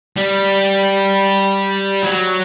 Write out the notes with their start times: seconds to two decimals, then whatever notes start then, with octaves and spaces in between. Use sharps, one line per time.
0.17 G3
2.03 F#3